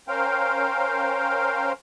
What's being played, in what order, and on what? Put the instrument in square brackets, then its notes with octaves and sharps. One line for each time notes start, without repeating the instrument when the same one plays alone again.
[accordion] C#4 A#4 C5 F5 G5